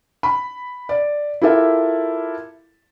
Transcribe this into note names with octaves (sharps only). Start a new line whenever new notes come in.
B5
D5
E4 F4 G4 A4 A#4 E5